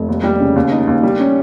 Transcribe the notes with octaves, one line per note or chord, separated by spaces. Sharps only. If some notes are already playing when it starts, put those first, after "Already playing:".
Already playing: F1
D#2
G3
C#3
D#2
D#4
D#2
G3
C#4